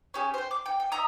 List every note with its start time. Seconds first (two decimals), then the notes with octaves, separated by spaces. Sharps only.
0.14 C#4 G4 G#4
0.34 C5 G5
0.51 D6
0.66 G5
0.80 G5
0.92 D#5 E5 A#5 D#6